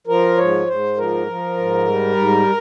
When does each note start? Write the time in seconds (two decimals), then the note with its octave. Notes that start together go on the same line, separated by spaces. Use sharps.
0.07 F3 A#4
0.37 G#2 C#5
0.67 G#2 C5
0.97 F3 A#4
1.26 F3
1.57 G#2
1.87 G3
2.16 G#2